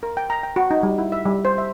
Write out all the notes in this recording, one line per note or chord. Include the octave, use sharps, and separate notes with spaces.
A#4
G5
A#5
G5
F#4
D#4
G3
E4
E5
G3
C5
E5